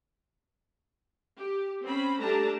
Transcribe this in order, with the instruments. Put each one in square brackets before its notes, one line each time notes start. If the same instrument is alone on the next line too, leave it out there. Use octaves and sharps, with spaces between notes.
[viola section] G4
C4 C#4 B5
G3 A3 D4 G4 A5 A#5